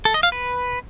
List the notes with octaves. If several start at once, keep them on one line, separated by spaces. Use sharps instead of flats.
A4
D#5
F5
B4